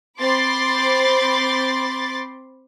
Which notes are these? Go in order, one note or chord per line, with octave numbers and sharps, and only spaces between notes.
C4 B5 C6 D6 A6